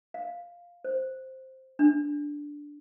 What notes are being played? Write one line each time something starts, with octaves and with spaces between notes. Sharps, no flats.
F5
C5
D4